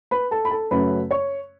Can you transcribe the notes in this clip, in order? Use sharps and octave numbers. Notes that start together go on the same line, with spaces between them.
B4 B5
A4 A5
B5
A4 A5
F#2 C#3 F#3 A3 C#4 B4 B5
C#5 C#6